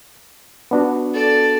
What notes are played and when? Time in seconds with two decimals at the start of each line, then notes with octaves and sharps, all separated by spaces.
0.71 B3 D4 F#4
1.14 A4 D5